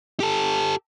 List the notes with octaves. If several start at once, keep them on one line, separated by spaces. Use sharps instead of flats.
G4 A4